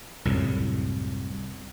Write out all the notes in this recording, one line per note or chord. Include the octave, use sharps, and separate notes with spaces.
C2 F#2 A2